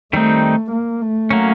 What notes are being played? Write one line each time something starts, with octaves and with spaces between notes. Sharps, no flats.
D#3 G3 A3 C4 D#4
A#3
A3
F#3 A#3 C#4